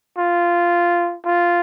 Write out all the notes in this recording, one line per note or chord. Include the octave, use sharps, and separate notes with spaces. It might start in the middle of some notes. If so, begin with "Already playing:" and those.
F4
F4